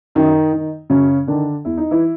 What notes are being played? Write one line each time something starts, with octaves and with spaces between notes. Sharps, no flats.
F#2 D#3 D#4
D#3
F#2 C#3 C#4
D3 D#3 D4
E2 E4
D#4
E3 E4